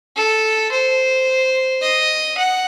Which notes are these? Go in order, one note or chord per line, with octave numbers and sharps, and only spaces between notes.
A4
C5
D#5
F#5